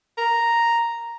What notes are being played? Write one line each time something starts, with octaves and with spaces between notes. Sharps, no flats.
A#5